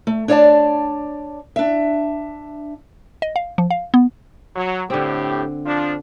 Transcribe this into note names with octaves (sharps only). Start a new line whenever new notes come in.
A3
D4 C#5 D5 E5 A5
D4 E5
D#5
F5
F3
F5
B3
F#3
A2 D3 C4 G4
F3 D4